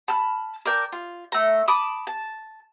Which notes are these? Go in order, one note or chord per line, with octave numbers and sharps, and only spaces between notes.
A5 B5 F6
A#4 D5 G5 A5
F4
A3 A#5
A5 B5 D6 D#6
A5